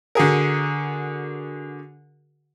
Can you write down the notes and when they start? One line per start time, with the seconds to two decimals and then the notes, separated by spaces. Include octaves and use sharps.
0.15 D3 F#4 G#4 A#4